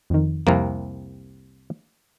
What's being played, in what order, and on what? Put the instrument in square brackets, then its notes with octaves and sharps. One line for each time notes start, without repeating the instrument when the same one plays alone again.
[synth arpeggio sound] F2 D#3
[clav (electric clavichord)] C2 C3 A#3 [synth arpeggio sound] F2